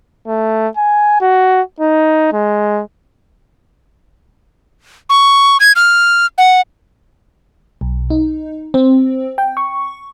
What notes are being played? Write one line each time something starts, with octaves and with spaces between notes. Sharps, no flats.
A3
G#5
F#4
D#4
G#3
C#6
G#6
F6
F#5
B1
D#4
C4
G5
C#6